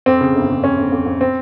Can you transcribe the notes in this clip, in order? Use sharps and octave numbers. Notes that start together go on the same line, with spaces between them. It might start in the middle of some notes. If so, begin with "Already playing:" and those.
F2 C4
C#3
G1
C#3
F2 C#4
G1
F2
F2
C4